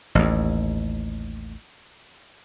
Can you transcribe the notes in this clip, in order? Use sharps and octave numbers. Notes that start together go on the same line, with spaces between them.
A1 D#2